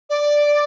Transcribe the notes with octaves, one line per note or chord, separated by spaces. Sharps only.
D5